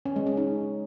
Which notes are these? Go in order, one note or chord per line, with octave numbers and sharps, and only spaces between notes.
C#4
G#3
C#4
D#4